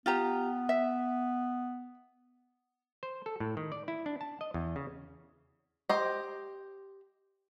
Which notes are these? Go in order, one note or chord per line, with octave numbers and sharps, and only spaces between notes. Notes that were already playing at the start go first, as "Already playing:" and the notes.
B3 F4 G4 A#5
E5
C5
A4
A2
D#3
D5
E4
D4
A5
D#5
E2
C#3
G4 C5 D#5